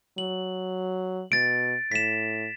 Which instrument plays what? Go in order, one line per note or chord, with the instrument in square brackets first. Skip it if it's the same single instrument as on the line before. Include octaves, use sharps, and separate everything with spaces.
[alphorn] F#3 [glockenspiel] F#7
[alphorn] B2 [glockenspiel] A6 D7
[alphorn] A2 [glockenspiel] B6 E7